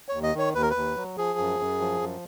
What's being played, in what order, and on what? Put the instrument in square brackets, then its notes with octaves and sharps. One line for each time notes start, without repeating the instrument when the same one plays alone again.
[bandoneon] D#2 C#5
D#5
D#3 C#5
D#2 B4
A#4
B4
D#2
F#3
F3 G#4
F#2
F#2
F3
F#2